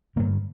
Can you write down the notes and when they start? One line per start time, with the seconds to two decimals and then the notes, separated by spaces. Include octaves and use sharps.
0.16 G2 D3 A#3